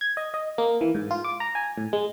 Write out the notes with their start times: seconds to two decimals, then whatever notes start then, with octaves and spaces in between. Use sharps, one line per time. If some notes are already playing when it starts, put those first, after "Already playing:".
0.01 G#6
0.17 D#5
0.34 D#5
0.58 A#3
0.81 E3
0.95 G#2
1.11 F4
1.24 D6
1.40 A#5
1.55 G#5
1.78 A2
1.93 G#3